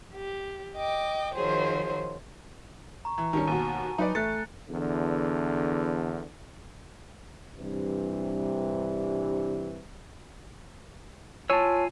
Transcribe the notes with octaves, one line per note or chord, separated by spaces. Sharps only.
G4
D#5 G5 D6
D#3 F3 F#3 G#4 C5
A#5 C#6
E3 A#5
B1 D#3 G3 C#4 A5 A#5
G#1 D#2 B2 G#5 D#7
F#3 D#4 B4 D5
A1 A3 F#6 A6 C#7
E2 D3
G2 C3 E3
F4 C#5 G#5 A5 E6